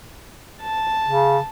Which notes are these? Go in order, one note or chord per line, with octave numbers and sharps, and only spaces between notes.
A5
C#3